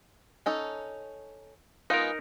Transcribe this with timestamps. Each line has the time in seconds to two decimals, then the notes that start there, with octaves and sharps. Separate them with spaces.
0.46 C#4 D#4 A4
1.90 G#3 B3 D#4 F4 A#4